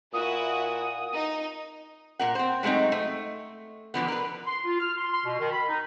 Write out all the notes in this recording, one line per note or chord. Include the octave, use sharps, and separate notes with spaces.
A#2 E4 F#4 D#6
D#4
A#2 A#4 F#5
C4 C5
F#3 G#3 A3 C4 D#4
A3
D3 E3 F3 B3
A#4 B4
C6
F4
F6
C6
C6
B2
D#3
B5
D#4